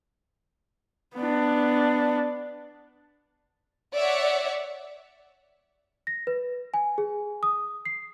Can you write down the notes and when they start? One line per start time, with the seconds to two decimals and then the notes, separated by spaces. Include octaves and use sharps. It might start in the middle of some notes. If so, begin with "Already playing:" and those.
1.16 B3 D4
3.95 C#5 D5 E5 F#5
6.07 A#6
6.27 B4
6.74 G#5
6.98 G#4
7.43 D#6
7.85 C7